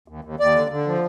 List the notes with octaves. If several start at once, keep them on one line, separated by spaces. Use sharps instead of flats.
D#2
D#2
D#2 D5
D3
D3
F3